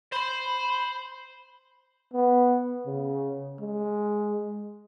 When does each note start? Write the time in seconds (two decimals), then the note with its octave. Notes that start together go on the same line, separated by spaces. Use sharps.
0.12 C5 B5 C6
2.13 B3
2.86 C#3
3.59 G#3